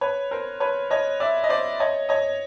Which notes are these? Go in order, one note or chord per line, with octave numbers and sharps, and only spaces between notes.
B4 C#5
A#4 C5
B4 C#5
C#5 D#5
D5 E5
D#5
C5 D5
C#5 D#5
C#5 D#5